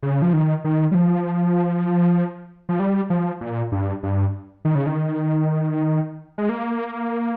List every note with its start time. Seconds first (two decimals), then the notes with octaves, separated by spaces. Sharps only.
0.03 C#3
0.22 F3
0.33 D#3
0.64 D#3
0.91 G3
0.95 F3
2.69 F3
2.80 G3
3.10 F3
3.41 A#2
3.72 G2
4.03 G2
4.65 D#3
4.75 C#3
4.86 D#3
6.38 G#3
6.49 A#3